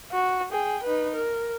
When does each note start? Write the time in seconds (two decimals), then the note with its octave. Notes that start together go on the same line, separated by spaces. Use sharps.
0.12 F#4
0.52 G#4 G5
0.83 D#4 B4
1.15 A#4